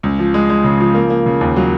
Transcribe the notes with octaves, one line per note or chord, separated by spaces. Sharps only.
C#2
F3
G#3
G#3
C#3
F3
A#3
A#3
C#3
D#2
F#3